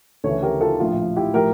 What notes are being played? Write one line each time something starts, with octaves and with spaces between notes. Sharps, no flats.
D2 C#3 E3 A4 C#5
G4 A#4
F4 A4
A#1 A2 F3 F4
E4 G4
A2 F3 G4 A#4